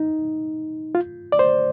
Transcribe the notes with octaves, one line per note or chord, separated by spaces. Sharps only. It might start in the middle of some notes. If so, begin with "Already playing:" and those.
Already playing: D#4
F4
D5
C5